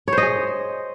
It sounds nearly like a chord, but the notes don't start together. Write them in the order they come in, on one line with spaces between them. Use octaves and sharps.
C#5 C5 D#5 G#4